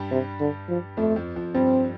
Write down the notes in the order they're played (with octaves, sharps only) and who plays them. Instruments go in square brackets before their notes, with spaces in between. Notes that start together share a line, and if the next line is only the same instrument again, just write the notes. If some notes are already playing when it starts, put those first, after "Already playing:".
Already playing: [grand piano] G2 G3
[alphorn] C3
D3
F3
[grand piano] F2 F3 [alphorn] A3
[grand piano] F2 F3
F2 F3
[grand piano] G2 G3 [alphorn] C4